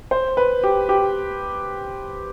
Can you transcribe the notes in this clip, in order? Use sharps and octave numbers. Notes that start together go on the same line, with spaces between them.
C5
B4
G4
G4